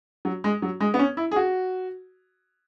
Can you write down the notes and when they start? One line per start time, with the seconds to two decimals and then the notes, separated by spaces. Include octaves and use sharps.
0.25 F#3
0.44 G#3
0.62 F#3
0.80 G#3
0.94 B3
0.99 C#4
1.17 E4
1.31 G#4
1.36 F#4